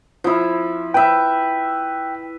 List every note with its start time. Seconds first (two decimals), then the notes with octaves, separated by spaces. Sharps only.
0.24 F3 E4
0.94 B4 E5 G5